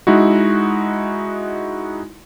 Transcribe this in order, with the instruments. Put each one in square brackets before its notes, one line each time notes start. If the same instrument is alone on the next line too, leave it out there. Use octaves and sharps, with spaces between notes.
[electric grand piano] G#3 D#4 E4 F#4